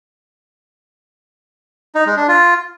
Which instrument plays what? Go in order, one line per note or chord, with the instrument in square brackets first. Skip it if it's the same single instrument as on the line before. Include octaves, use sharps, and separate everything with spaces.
[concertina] D#4
G#3
D4
F4